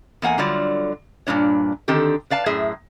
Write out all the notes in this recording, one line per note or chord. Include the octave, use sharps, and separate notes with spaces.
E2 A#3 F#5 G#5
D3 F#3 G3 F4 D5
G2 A#2 G3 D4 C#5
D3 D#3 C4 G4 A4
B4 D5 F5 A5
F#2 A2 G#4 E5